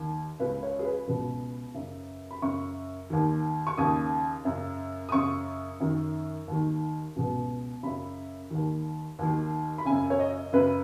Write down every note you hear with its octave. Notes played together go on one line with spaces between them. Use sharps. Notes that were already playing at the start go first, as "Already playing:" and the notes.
Already playing: D#2 D#3
C#2 C#3 B4
C#5
G#4
B4
C#2 B2 B4
F#2 C#3
B5
F#2 C#3 C#6
D#2 D#3
C#6
D#2 C#3 D#6
F#2 C#3
D#6
F#2 C#3 C#6
F#2 D#3
D#2 D#3
C#2 B2
F#2 C#3 B5
D#2 D#3
D#2 D#3
B5
F#2 C#3 G#5
C#5
D#5
F#2 C#3 B4